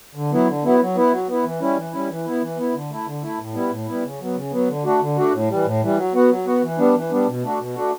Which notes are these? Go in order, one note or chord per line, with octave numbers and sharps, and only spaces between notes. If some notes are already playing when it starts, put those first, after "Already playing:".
D3
F#3 B3 E4
D3
F#3 B3 E4
F#3
B3 E4
F#3
B3 E4
E3
G3 C#4 E4
E3
G3 C#4 E4
E3
B3 E4
E3
B3 E4
D3
A3 E4
D3
A3 E4
A2
G3 B3 E4
A2
G3 B3 E4
C#3
F#3 B3
C#3
F#3 B3
D3
A3 D4 F#4
D3
A3 D4 F#4
A2
E3 G3
A2
E3 G3
F#3
B3 F#4
F#3
B3 F#4
E3
G3 B3 D4
E3
G3 B3 D4
B2
A3 D4 F#4
B2
A3 D4 F#4